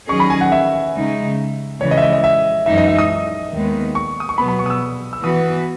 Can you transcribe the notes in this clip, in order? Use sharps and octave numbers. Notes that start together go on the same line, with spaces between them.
D#3 F#3 C#4 G#4 D#5 C#6
B5
G#5
F#5
E5
C#3 G#3 D#4
C#3 E3 G#3 C#5
D#5
E5
D#5
D#5
E5
F#2 E3 G#3 D#4 E5
D#5
E5
D#6
D#2 D#3 G#3 B3
C#6
D#6
C#6
B2 F#3 B3 B5
B5
C#6
D#6
E6
E6
E3 B3 F#4 B4 D#6